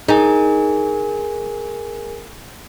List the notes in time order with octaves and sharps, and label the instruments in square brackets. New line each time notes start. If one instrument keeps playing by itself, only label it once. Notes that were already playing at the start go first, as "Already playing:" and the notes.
[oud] D#4 [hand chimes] G#4 A#4 G#5